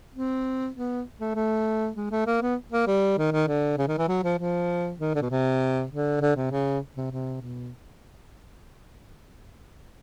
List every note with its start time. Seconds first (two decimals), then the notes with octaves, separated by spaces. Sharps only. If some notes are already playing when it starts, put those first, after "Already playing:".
0.14 C4
0.75 B3
1.20 A3
1.35 A3
1.96 G#3
2.11 A3
2.27 A#3
2.42 B3
2.72 A#3
2.87 G3
3.18 D#3
3.33 D#3
3.48 D3
3.78 C#3
3.88 D#3
3.98 E3
4.08 F#3
4.23 F3
4.39 F3
5.00 D#3
5.15 D3
5.22 B2
5.30 C3
5.91 D3
6.21 D3
6.36 C3
6.52 C#3
6.97 C3
7.12 C3
7.42 B2